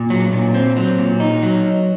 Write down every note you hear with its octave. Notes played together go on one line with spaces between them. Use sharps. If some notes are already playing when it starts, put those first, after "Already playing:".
Already playing: A#2
F#3
A#2
C4
F#3
A#2
D#4
F#3